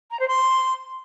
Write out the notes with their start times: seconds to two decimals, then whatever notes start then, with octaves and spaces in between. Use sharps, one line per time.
0.11 A#5
0.19 C5
0.28 C6